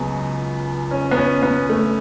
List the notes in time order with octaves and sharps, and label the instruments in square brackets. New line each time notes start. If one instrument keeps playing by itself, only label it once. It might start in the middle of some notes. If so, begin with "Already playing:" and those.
Already playing: [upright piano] C#2 C#3 F#3 B3
C#4
B3
C#4
B3
A3